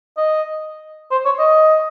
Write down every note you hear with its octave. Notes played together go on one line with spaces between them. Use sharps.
D#5
C5
C#5
D#5